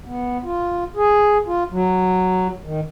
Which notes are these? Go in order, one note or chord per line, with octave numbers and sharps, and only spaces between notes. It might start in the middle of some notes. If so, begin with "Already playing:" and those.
B3
F4
G#4
F4
F#3
D#3